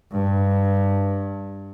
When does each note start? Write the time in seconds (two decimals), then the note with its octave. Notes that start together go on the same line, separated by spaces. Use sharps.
0.12 G2